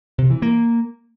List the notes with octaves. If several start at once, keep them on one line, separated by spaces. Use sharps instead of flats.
C3
E3
A#3